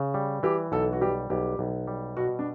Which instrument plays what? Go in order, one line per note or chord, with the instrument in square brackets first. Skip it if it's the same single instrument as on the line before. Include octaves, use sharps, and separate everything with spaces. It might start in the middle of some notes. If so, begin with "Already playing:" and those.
Already playing: [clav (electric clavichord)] C#3
G3
[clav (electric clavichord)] E3 [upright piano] G4
[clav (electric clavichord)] B1 [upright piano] A4
[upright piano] F#4
[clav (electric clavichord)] G3 [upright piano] G4
[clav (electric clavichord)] B1 [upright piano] G4
[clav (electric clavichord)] B1
G3
[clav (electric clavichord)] B2 [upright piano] F#4
[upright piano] D4